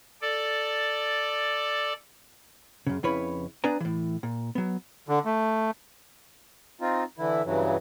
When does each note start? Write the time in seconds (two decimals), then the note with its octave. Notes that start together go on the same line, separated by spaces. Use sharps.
0.22 A4 D5
2.87 F#2 C#3
3.03 F2 C#3 E4 B4 C#5 B5
3.64 B3 D4 B4 D5 G#5 A#5
3.80 A2 E3
4.23 A#2
4.55 F#3 B3
5.08 D3
5.25 A3
6.81 C4 D#4 F4
7.18 D3 E3 E4
7.44 G2 C#3 E3 F#3